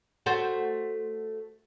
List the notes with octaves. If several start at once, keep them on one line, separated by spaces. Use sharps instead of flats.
A3 F#4 C5